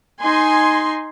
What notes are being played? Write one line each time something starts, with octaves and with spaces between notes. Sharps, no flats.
D#4 G#5 C6